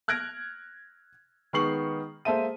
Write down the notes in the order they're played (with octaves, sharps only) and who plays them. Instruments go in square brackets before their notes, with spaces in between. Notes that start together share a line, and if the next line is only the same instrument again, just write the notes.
[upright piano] F6 F#6 G#6 A#6 D7
D#3 G#3 B3 C#6 C7 F#7
G#3 A#3 A4 C5 E5 D#7